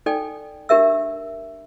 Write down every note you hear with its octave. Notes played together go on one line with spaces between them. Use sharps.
D#4 A4 D5 G5 G#5
D4 G4 A#4 E5 E6